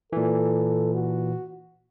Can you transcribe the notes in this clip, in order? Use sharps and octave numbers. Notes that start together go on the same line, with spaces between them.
A#2 E3 A4
F#4